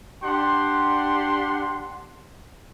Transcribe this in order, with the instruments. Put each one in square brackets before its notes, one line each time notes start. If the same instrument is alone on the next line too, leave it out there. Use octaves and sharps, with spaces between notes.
[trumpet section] D4 G4 F#5 C6